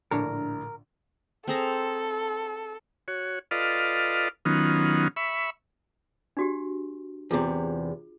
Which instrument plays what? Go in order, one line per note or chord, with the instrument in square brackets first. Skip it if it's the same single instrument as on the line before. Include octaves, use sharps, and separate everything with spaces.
[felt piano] A#1 A2 D3 [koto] D4 C#5 [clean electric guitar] A#4
[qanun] C4 G#4 A#5 [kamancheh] A4
[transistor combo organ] F#4 C#5
F4 A4 B4 D5 D#5 F5
D#3 F#3 B3 C#4 D#4 F4
E5 B5 C#6
[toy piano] D4 F#4 G4
[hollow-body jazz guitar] E2 C3 [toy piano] F4 G#4